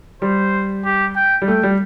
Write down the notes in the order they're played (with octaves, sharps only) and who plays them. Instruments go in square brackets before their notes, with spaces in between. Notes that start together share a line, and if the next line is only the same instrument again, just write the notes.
[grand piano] G3 [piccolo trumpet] C5
[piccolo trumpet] G4
G5
[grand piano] G3
[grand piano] A3 [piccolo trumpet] G5
[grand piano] G3